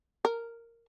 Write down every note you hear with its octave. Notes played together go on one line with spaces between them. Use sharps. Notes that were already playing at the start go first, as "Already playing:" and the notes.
A#4